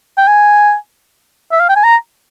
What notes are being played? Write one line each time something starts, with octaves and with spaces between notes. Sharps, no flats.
G5
G#5
E5
F5
G5
G#5
A#5